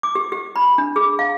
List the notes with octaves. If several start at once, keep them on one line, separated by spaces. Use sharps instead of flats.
D6
G4
G4
B5
D4
G#4
F5